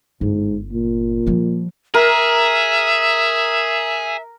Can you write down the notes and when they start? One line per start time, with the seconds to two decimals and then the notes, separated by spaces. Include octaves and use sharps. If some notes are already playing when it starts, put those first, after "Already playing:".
0.21 G1 G#2
0.73 A#2
1.27 F3 G3
1.94 G#4 A#4 E5